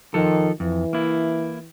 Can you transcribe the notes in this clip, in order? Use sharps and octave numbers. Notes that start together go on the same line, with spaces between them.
D#3 F3 A4
F2 E3
A#3 E4